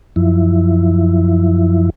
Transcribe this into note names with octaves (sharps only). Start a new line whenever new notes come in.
F#2 F3 E4